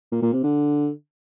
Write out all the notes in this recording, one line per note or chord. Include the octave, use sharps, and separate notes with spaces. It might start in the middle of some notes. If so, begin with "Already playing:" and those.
A#2
A#2
C3
D3